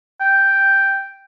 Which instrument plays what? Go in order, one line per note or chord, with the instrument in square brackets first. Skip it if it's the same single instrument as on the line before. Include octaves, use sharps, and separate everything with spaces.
[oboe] G5